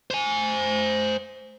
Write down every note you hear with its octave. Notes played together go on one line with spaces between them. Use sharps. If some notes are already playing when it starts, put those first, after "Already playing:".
C5 G#5